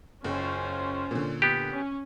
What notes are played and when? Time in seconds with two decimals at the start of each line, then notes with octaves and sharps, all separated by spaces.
0.24 F#1 C#4 F4 C5
1.11 A#2 D3
1.42 B3 G4
1.72 C#4